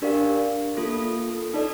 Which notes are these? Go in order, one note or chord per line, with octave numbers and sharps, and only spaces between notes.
D4 G4 A#4 D5 F5
A#3 F4 A4
D#4 A4 D5